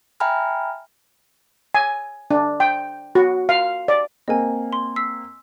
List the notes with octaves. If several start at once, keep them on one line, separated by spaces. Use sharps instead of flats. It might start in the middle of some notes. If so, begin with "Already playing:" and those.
E5 G5 G#5 A#5 B5 F6
G#5
D4
G5
F#4
F5
D5
A#3 C4 D#5 G#5
C6
E6 B6 C7